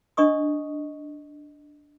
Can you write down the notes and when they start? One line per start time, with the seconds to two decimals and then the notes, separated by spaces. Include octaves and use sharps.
0.17 D4 D#5 C#6 D#6